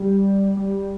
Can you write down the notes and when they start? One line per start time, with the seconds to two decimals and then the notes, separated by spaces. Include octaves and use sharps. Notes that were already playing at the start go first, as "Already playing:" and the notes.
Already playing: G3
0.57 G3